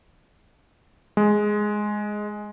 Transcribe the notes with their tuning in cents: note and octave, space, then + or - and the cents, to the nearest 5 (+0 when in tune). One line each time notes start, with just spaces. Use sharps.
G#3 +5